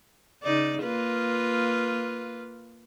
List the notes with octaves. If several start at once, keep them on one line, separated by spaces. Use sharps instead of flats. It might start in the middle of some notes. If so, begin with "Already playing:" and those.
C#3 D#4 D5
A#3 F4 B4